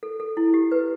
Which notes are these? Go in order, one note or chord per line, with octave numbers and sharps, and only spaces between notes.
A4
A4
E4
G4
B4